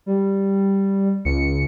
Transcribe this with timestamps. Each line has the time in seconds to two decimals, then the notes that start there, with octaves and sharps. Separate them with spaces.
0.06 G3
1.25 C#2 C#7